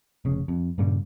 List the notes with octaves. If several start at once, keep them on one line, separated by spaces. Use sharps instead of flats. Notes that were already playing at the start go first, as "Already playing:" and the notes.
F1 C#3
F2
G2 A#2 C#3 G3